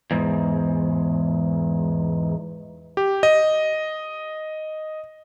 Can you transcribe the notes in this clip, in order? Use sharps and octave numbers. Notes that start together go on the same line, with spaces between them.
E2 G#2
G4
D#5